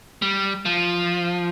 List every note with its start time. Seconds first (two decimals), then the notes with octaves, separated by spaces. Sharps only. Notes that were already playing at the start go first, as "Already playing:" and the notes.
0.22 G3
0.65 F3